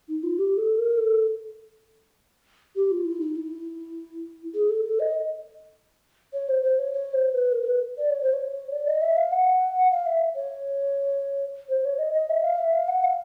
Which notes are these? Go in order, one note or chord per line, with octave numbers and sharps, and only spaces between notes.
D#4
F4
G4
A4
A#4
A4
G4
F4
E4
D#4
E4
G#4
A4
A4
D#5
C#5
C5
C5
C#5
C#5
C5
B4
A#4
A#4
B4
D5
C#5
C5
C#5
D5
D#5
E5
F5
F#5
F5
E5
C#5
C5
C#5
D#5
D#5
E5
F5
E5
F5
F#5
F5